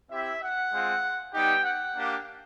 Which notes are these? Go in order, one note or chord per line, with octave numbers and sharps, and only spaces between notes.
C4 E4 G4 E5
F#5
G#3 C4 F4
G3 B3 D#4 G4 G5
F#5
A#3 D4 G4